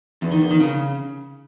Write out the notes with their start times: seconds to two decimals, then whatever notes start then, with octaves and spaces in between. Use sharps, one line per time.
0.22 E2
0.32 D#3
0.41 E2
0.51 D#3
0.60 C#3